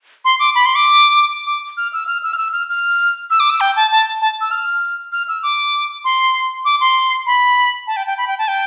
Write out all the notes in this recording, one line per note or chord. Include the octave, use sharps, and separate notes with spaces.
C6
D6
B5
C6
D6
D6
F6
E6
F6
E6
F6
E6
F6
F6
E6
D6
E6
G5
A5
A5
A5
E6
F6
F6
E6
D6
C6
D6
C6
B5
A5
G5
G5
B5
G5
A5
G5